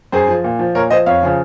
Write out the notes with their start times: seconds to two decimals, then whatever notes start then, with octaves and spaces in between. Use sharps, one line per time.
0.12 F#2 G#4 C5
0.28 F3
0.44 A#2
0.59 F3
0.75 A#2 A#4 C#5
0.90 F3 C5 D#5
1.06 F2 C#5 F5
1.23 C#3 F3